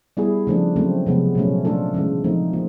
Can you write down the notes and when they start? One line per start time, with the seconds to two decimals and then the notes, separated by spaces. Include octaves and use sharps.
0.17 G3 B3 E4 G#4
0.47 C#3 F3 A3 D4
0.76 C#3 F#3 A3 C4
1.06 C3 F3 G#3 B3
1.35 A#2 F#3 A3 C#4
1.65 A3 D4 F4 A4
1.94 C#3 E3 G#3
2.24 F3 A3 C4 D#4
2.53 A#3 F4